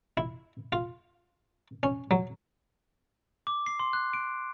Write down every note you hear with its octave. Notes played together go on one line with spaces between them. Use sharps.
E4
F4
C#4
F#3
D6
C7
C6
F#6
D7